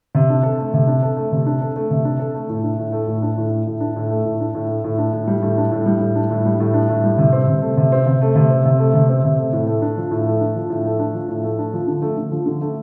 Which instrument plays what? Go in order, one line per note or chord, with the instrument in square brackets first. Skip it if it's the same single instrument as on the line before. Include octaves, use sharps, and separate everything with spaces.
[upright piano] C3
D4
A4
A3
C3
D4
A4
A3
C3
D4
A4
A3
C3
D4
A4
A3
A2
D4
A2
A3
A2
D4
A2
A3
A2
D4
A2
A3
A2
D4
A2
A3
A2
D4
A2
G3
A2
D4
A2
G3
A2
D4
A2
G3
A2
D4
A2
G3
C3
C4
C3
A3
C3
C4
C3
A3
C3
C4
C3
A3
C3
C4
C3
A3
A2
A3
D4
F3
A2
A3
D4
F3
A2
A3
D4
F3
A2
A3
D4
F3
D3
A3
D3
F3
D3
A3